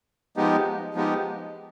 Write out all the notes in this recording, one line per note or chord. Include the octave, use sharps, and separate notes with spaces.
F3 G#3 B3 D#4 G4
F3 G#3 B3 D#4 G4